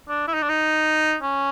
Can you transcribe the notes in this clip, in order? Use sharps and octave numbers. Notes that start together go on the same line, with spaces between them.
D4
E4
D#4
D4
D#4
C#4